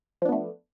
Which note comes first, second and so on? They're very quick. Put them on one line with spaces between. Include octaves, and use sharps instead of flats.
F3 D4 B3 A3